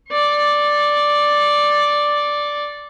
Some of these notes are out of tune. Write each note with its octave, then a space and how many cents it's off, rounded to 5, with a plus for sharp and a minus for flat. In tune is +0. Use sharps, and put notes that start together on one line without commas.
D5 +0 C#6 -40